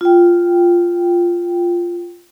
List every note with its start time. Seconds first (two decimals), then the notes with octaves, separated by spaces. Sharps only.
0.01 F4 G5